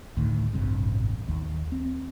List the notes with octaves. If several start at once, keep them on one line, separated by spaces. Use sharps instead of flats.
D2 A2 D#3
D#1 A1 G2 C3
D#2
C4